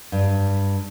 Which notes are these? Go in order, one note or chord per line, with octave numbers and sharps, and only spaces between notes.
G2